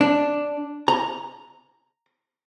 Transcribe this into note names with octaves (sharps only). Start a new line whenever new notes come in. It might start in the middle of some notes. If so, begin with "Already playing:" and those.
D4
A#5